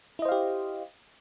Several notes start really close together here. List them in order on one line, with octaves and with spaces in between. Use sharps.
E4 D#5 C5 F5 G4